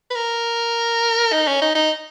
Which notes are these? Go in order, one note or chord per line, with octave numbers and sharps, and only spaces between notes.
B4
A#4
D#4
C#4
D#4
D#4